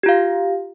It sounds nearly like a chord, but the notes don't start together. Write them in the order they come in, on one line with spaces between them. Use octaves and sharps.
G4 F4 F5